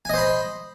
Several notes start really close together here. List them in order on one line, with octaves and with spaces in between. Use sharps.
G#5 D#5 C5 B5